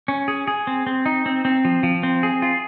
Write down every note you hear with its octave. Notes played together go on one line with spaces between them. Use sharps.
C#4
G#4
G#4
C4
C4
D#4
C4
C4
F3
F3
C4
G#4
F4